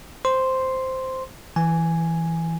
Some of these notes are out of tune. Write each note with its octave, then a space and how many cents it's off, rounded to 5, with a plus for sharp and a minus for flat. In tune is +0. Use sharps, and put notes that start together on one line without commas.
C5 -5 C6 +0
E3 +0 G#5 +0